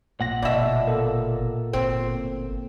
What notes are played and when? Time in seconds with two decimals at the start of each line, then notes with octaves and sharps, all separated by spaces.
0.21 A#1 A#2 F#5 A#6
0.42 G1 B2 D5 E5
0.87 A#3 A4
1.73 G1 C4